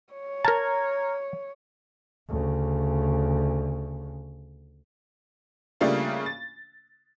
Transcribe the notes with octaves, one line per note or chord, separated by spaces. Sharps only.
C#5
A#4 A5 A#5 F6 G#6
D2 C#3
C#3 G3 A3 A#3 D4 F4
A6